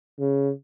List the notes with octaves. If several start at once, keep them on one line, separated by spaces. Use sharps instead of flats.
C#3